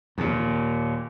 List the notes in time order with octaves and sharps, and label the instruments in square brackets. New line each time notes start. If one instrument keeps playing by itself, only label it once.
[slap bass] D#2 A#2